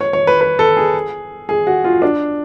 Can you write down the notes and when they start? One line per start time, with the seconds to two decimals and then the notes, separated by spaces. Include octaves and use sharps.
0.01 C#5
0.13 C#5
0.27 B4
0.41 B4
0.59 A4
0.77 G#4
1.49 G#4
1.67 F#4
1.84 F4
2.02 D4